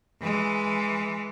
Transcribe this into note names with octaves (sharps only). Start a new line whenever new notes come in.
E3 G#3